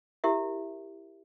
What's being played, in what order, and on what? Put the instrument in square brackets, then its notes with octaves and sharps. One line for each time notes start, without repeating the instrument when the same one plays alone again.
[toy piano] E4 G4 A#4 E5